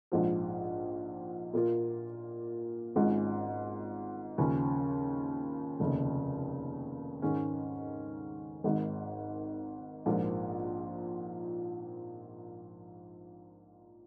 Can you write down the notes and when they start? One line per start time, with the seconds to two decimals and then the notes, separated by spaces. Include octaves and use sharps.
0.12 A#1 G#2 F3
1.53 A#2 A#3 F4
2.96 G#1 G#2 G#3 C#4 F4
4.38 D#2 C#3 F3 C#4
5.80 F1 D#2 C#3
7.22 G#2 D#3 G#3 C#4
8.64 G#1 G#2 D#3
10.06 A#1 G#2 F3 A#3 F4